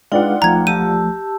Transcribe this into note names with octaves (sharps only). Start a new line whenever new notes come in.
G#3 D4 D#4 F4 B4 D5 F#5 G5
B1 F3 A3 A#5 G#6
G4 A5 E6 D#7